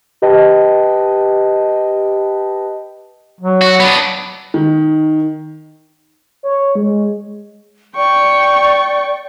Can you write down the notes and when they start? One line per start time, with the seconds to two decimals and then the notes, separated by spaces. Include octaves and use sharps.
0.22 G4 B4 D#5 G5 A5
3.40 F#3
3.62 F#4
3.80 B3 D4
4.54 D#3
6.43 C#5
6.75 G#3
7.96 D5 G5 C#6